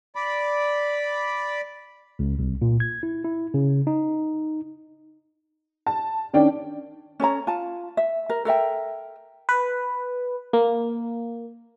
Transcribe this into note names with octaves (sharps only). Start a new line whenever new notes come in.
D5 B5
C#2
C2
A#2
G#6
E4
E4
C#3
D#4
A5
D#3 C#4 D4 G5
C#4 A4 C#5 A#5
F4 A5
E5
A#4
A4 A#4 E5 G5
B4
A#3